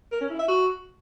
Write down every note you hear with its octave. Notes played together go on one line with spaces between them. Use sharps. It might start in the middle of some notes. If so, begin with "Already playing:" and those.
A#4
C#4
E4
E5
F#4